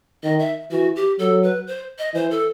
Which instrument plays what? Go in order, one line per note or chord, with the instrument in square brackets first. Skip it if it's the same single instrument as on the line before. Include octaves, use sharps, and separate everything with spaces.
[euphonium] D#3 [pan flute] D#5
[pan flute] E5
[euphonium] E3 [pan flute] F#4
[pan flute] G4
[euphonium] F#3 [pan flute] A4
[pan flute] B4
C5
D#5
[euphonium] E3 [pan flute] C5
[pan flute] A4